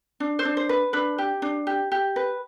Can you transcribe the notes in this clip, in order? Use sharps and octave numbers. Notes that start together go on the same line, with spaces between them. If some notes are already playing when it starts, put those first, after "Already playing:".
D4
C5
D4
C5
B4
D4 B4
G4
D4
G4
G4
B4